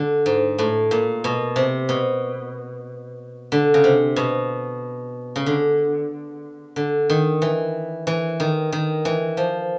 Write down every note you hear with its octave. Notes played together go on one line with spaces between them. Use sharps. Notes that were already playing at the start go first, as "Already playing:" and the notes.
Already playing: D3
G#2
A2
A#2
B2
C3
B2
D3
C#3
C3
B2
C#3
D3
D3
D#3
E3
E3
D#3
D#3
E3
F3